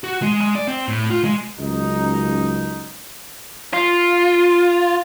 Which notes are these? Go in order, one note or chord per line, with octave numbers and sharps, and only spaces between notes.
F#4
G#3
G#3
D5
C4
A2
F4
G#3
C#2 F#2 D#4
F4